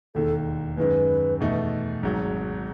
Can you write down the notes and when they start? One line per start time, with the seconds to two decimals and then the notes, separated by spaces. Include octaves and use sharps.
0.15 E1 D#2 D#3 A4
0.77 F#2 D#3 G#3 B4
1.40 E2 B2 A3 D#4
2.03 G#1 G#2 F#3